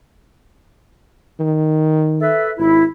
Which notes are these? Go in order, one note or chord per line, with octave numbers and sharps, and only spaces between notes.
D#3
A4 B4 E5
G#1 E4